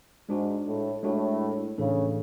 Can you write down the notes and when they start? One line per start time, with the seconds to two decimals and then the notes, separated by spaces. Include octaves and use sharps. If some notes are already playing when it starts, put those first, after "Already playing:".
0.29 G#2 G#3 D4 F#4
0.66 A2
1.03 A2 G#3 D4 F#4
1.78 A2 C#3 E3 A3 D4 A4